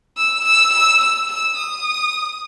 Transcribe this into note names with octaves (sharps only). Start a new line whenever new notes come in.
E6
E6
E6
E6
E6
D#6